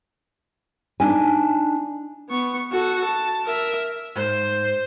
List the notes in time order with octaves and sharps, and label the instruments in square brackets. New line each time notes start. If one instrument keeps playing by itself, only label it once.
[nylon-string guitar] D4 D#4 G#5
[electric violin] B3 C#6
F#4 A4
A5
A#4 E5
[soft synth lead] G#2 [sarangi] C5